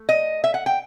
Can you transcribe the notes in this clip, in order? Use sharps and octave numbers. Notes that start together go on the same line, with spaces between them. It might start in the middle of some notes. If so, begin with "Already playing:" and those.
Already playing: A3
D#5
E5
F#5
G5